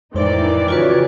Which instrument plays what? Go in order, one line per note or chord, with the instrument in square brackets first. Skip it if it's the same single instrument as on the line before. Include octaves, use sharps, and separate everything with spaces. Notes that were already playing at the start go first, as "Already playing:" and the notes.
[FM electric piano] F2 G#3 C5 [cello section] A2 D#4 [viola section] D#3 E3 D5
[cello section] F#2 C#3 C#5 [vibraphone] F4 F#4 B4